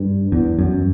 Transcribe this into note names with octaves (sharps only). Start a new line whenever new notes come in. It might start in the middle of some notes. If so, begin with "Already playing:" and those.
Already playing: G2
E2
F#2